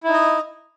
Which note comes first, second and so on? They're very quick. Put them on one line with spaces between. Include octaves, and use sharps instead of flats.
E4 D#4 D#5